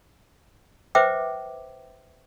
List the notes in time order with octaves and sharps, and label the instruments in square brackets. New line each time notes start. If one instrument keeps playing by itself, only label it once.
[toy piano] B4 C5 E5 G5 D6